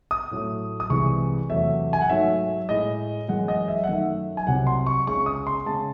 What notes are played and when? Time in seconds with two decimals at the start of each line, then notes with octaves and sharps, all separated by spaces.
0.11 D#6
0.31 A2 F#3 A3
0.80 D#6
0.90 C2 C3 E3 G#3 C#6
1.50 E2 C3 F#3 A3 E5
1.93 G#5
2.01 F#5
2.09 G#2 F#3 A3 E5
2.69 A2 G#3 D#5
3.28 F#2 E3 G#3 F#5
3.48 D#5
3.68 E5
3.84 F#5
3.87 F#2 D#3 A3 E5
4.37 G#5
4.47 C2 C3 F#3 F#5
4.67 C6
4.87 C#6
5.07 C#2 C#3 G#3 C#6
5.26 D#6
5.47 C6
5.66 C#3 G#3 A5